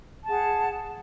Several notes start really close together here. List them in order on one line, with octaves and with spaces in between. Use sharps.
A5 G#4 F#5